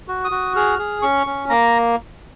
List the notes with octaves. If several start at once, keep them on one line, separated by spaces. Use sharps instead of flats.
F#4
D#6
F#4
G#4 F6
G#4
C#4 C#6
C#4
A#3 A#5